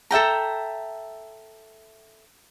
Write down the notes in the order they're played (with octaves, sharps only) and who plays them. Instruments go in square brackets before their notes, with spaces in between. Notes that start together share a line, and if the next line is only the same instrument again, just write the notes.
[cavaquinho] A4 E5 G5 A#5